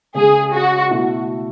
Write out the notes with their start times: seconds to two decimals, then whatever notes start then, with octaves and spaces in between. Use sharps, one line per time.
0.14 C#3 G#3 C#4 G#4
0.53 F#4
0.90 B2 A3 E4 A4